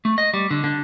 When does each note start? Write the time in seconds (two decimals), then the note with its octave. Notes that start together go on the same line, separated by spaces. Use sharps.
0.05 A3
0.18 D#5
0.34 G3
0.51 D3
0.64 D3